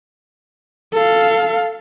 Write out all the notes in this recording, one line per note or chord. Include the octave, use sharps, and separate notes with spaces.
A4 F5